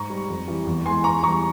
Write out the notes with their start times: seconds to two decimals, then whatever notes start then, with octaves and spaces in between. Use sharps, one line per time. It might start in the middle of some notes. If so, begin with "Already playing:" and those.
Already playing: G#2 A#5 C#6
0.10 G3
0.29 F2
0.48 E3 G3
0.66 E2
0.86 E3 G#3 G#5 C6
1.04 E2 A#5 C#6
1.23 E3 G3 A#5 C#6